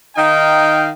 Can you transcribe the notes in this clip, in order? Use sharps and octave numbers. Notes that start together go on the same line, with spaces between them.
D#3 D#4 F5 G5